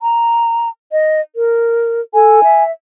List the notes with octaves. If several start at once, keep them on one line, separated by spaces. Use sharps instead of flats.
A#5
D#5
A#4
A4 G#5
E5